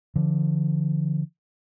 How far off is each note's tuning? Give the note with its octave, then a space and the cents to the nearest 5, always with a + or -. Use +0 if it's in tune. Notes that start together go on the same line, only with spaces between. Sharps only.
D3 +0 F3 -35